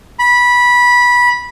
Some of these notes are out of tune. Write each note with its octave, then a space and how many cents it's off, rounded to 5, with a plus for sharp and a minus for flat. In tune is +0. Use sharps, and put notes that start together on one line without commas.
B5 -15